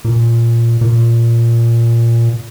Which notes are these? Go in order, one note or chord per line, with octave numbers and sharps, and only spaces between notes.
A#2
A#2